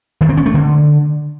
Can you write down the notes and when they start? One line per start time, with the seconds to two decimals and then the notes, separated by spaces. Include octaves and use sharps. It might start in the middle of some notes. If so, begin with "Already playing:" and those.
0.21 D#3
0.29 C4
0.37 C#4
0.46 A3
0.54 D3